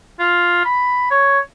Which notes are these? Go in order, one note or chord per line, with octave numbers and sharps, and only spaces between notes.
F4
B5
C#5